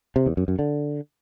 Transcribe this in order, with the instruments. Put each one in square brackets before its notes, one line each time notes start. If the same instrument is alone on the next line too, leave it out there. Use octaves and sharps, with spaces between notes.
[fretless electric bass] C3
E2
F#2
F#2
D3